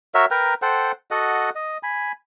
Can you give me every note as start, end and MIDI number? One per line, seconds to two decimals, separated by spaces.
0.14 0.26 66
0.14 0.26 70
0.14 0.26 73
0.14 0.26 76
0.31 0.54 70
0.31 0.54 71
0.31 0.54 79
0.31 0.54 82
0.62 0.92 69
0.62 0.92 72
0.62 0.92 78
0.62 0.92 79
1.11 1.50 66
1.11 1.50 69
1.11 1.50 75
1.11 1.50 78
1.55 1.78 75
1.83 2.12 80
1.83 2.12 83